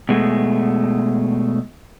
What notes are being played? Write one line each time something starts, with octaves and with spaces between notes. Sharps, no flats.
B2 G#3 A3